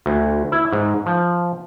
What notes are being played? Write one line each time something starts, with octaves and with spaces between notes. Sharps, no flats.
D2
E4
G#2
F3